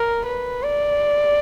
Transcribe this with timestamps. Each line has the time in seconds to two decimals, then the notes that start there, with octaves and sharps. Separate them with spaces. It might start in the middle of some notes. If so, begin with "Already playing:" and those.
Already playing: A#4
0.25 B4
0.63 D5